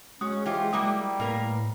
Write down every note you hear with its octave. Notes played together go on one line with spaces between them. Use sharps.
G#3 C#4 F#4 D#6
E3 F4 G4 C5
F#3 G3 A#3 E4 G5 D6 D#6
A2 A#3 A#4 B4